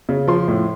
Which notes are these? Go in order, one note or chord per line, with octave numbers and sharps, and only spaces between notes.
C#3
F3 C6
A2